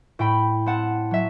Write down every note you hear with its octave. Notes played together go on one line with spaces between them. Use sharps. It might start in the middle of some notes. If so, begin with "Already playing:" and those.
A2 G5 B5
C4 F#5 A5
F#3 E5